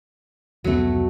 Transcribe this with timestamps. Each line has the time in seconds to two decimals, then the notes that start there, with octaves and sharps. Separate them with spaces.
0.64 F1 C#2 F#3 A3 B3